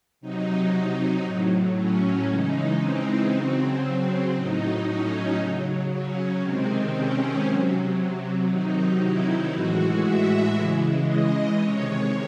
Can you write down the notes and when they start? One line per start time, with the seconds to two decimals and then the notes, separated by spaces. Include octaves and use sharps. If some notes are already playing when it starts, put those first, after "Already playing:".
0.21 C3 F#3 D#4
1.25 A2 F#3
1.76 C#4
2.28 C#3 E3 G#3 D#4
2.80 C4
3.31 C#3 F#3 C4
4.35 A2 F#3 D#4
4.87 C#4
5.38 C#3 F#3
5.90 C#4
6.41 C3 D#3 G#3 C4
6.93 C#4
7.44 C3 F#3
8.48 C3 D#3 F#3 D#4
9.00 E4
9.51 A2 E3 G#3 F#4
10.04 E5
10.55 C#3 E3 G#3
11.06 D#5
11.58 C3 D#3 G#3 C#5